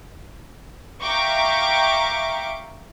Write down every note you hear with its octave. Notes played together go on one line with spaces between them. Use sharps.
E5 F5 G5 A#5 C#6 D6